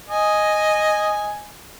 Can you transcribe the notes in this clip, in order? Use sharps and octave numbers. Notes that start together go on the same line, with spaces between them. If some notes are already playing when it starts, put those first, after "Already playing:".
D#5 G#5